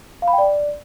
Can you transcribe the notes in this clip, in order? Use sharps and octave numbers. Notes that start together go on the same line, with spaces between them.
F5
B5
G5
D5